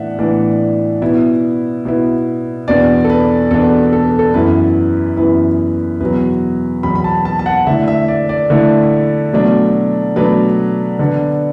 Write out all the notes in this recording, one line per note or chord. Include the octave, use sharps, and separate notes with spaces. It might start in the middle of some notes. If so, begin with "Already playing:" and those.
Already playing: A2 E3 B3 D4 E5 F#5
A2 E3 B3 D4 D5
B2 B3 E4
B2 B3 E4
E2 B2 B3 D4 D5
A4
B4
E2 B2 B3 D4 A4
A4
A4
F#2 E3 B3 E4 B4
F#2 E3 B3 E4 B4
E2 B2 F#3 B4
E2 B2 F#3 B5
B5
A5
A5
A5
F#5
D3 A3 E4 E5
E5
D5
D5
D3 A3 E4
B2 F#3 A3 D4
B2 F#3 A3 D4 B4
D3 B3 D4